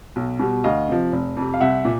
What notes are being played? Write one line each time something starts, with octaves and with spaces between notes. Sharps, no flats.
B1
B2 G3
D2 D#5 F5
C3 F3
F1
F2 C3
F5
C2 E5 F#5
A#2